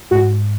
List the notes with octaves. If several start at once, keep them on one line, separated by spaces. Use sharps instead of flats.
G#2 F#4